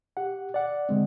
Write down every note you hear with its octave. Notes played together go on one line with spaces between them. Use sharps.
G4 F#5
D5 F#5
D3 G#3 C4